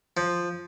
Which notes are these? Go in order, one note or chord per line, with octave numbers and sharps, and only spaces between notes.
F3